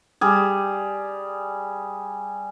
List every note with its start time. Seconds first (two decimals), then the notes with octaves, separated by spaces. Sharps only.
0.21 G3 G#4